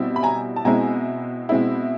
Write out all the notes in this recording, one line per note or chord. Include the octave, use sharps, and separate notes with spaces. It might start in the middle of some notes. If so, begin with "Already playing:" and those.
Already playing: B2 G3 C4 E4
B5
G#5 A#5
A5
B2 G#3 C4 E4 G#5 A#5
B2 G#3 C4 E4